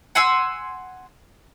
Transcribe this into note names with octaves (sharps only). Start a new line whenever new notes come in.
F#5 G#5 C6 E6